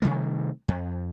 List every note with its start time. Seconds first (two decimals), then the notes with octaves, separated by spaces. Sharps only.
0.02 C3 D#3 G3 A3
0.68 F2